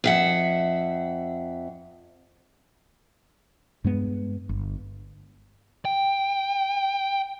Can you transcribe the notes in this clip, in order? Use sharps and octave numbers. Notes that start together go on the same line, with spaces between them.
F2 E5 F#5
G2 G#3 B3
G1
G5